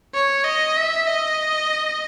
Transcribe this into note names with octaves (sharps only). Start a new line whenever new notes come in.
C#5
D#5
E5
D#5